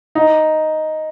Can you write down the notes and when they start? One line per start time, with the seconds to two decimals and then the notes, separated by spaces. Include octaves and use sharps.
0.15 D#4